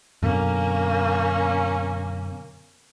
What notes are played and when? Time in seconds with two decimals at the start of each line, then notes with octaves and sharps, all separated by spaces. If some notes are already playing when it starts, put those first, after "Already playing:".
0.23 F#2 B2 D3 A#3 C#4